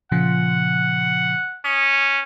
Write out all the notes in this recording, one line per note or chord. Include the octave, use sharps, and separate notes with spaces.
A#2 C#3 F3 F#5
C#4 D#6